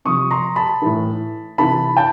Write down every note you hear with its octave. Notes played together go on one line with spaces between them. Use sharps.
C3 F3 C#6 D#6
A#5 C6
A5 B5
A2 E3
C3 E3 A5 B5
G5 A5